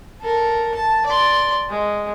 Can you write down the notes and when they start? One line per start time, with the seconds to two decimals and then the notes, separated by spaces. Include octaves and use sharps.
0.22 A4 A#4
0.75 A5
1.06 D5 C6
1.69 G#3